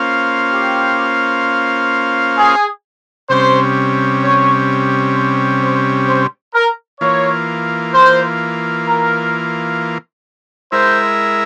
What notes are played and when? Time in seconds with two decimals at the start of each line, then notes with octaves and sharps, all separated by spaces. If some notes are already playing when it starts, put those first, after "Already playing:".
Already playing: A#3 C#4 F4 C5 F5
0.51 G4
2.37 G#4
3.29 C3 G3 C#4 C5
4.23 C#5
5.16 C5
5.62 C5
6.08 C5
6.54 A#4
7.01 E3 A#3 F4 C#5
7.93 C5
8.87 A#4
10.72 G#3 E4 A#4 C5 E5